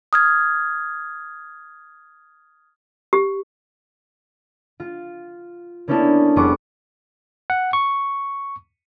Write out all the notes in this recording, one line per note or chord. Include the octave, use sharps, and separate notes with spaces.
D#6 F6 G#6
G4
F4
A#3 B3 C#4 D4 E4 A4
F1 G3 G#3 B3 C#6 D6
F#5
C#6